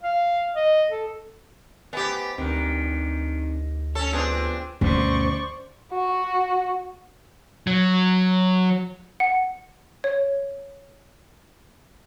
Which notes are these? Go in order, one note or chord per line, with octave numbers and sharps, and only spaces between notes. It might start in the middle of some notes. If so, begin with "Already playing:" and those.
F5
D#5
A4
B3 G4 C5 D#5 G#5
D2 D#3 C4 D4 D#4
C#4 A4 C#5
F3 B3 C4 D4 F4 G#4
D2 G2 B2 C#4 C5 D5 C#6
F#4
F#3
F#5
C#5